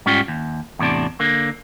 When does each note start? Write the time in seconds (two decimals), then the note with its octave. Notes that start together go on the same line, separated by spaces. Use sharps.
0.06 G#2 G3 C#4 F4 G5
0.28 D#2
0.79 E2 A2 C3 D4
1.20 D3 A#3